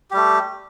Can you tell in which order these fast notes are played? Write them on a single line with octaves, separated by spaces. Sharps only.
G4 G3 A3